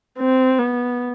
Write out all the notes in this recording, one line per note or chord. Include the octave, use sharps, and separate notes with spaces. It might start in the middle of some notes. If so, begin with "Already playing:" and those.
C4
B3